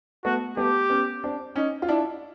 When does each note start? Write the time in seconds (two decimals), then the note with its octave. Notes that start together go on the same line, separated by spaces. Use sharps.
0.25 A3 B3 F#4
0.57 A3 B3 G4
0.90 B3 C#4
1.24 C4 D4
1.56 C#4 D#4
1.82 F4
1.88 D4 E4